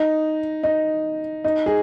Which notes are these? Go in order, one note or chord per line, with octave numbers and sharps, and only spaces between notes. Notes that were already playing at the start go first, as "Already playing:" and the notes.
Already playing: D#4
D#4
D#4
G#4